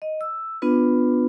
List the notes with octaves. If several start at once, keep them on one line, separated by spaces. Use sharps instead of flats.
D#5
E6
B3 D4 F4 B4